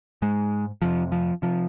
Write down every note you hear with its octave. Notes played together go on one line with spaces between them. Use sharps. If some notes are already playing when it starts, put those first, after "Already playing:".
G#2 G#3
F2 C3 F3
F3
C3 F3